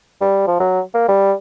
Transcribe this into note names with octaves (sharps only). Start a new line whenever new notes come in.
G3
F3
F#3
A#3
G3